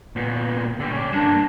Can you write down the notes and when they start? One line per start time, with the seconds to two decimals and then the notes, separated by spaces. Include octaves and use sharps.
0.16 A#2 B3
0.80 D3 G3
0.93 C#4 D5
1.12 G2 A#3 D4